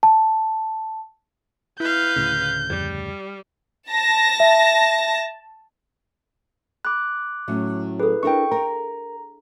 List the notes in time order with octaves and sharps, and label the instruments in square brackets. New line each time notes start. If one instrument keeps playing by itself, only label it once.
[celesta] A5
[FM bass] E4 [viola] B4 F5 [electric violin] G6
[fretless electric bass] D2 A2 C#3
[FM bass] F2 [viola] G3
[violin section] A5 A#6
[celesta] E5
[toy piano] B5 [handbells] D6 F#6
[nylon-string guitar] A2 F#3 C#4
[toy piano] G#4 A4 [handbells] B4
[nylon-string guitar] D4 E4 A#4 [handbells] G5 C#6
[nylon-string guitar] A#4 [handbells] A#5